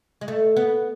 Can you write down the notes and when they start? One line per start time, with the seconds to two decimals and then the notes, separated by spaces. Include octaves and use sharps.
0.21 G#3
0.28 A3
0.56 B3